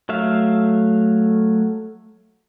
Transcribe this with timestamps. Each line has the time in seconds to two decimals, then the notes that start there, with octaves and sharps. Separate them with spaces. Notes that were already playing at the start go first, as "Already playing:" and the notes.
0.09 F#3 A3 E5 F5